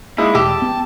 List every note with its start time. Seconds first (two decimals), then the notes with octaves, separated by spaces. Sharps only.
0.18 G#3 A#3 D#4 E4
0.35 E1 G4 A5 E6
0.62 B3